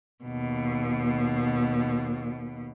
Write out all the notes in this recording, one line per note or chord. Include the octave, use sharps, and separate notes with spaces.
D#2 B2